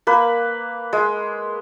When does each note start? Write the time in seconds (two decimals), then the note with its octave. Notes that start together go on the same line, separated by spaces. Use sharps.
0.07 A#3 B4
0.93 G#3